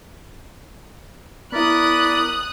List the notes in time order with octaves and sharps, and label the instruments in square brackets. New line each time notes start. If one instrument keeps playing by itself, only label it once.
[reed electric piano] B3 E4 [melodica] A#4 D5 B5 [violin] D#6 F#6